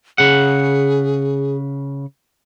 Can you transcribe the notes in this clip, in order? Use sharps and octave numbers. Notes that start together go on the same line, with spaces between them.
C#3 G#4 F#5